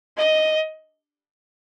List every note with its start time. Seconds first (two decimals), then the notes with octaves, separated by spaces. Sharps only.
0.17 D#5